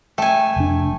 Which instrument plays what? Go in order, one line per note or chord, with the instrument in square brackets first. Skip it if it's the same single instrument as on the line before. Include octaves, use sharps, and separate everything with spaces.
[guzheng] A3 G#5 [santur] G5
[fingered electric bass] F1 D4